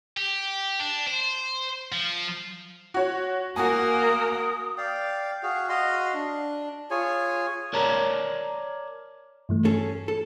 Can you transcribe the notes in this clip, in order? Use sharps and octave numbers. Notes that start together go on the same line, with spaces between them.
G4
D4
C5
F3
F#4 C#5
A#3 F#4 A#4 G#5 D#6
D5 F5 G5
F#4 G#4 F5
F#4 D#5 F5 C6
D4
F4 G#4 C#5 G#5
A#4 C#5 D5 A5 A#5
G2 E3 A3
C#4 G#4 A4
A4